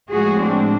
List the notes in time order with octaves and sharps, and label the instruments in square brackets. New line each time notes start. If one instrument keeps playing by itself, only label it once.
[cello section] A2 F3 G#3 F#4 G#4
C4 D4